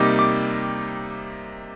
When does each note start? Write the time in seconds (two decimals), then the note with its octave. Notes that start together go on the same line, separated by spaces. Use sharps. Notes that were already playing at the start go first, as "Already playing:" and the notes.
Already playing: C3 G3 A#3 D#4 D6
0.19 D6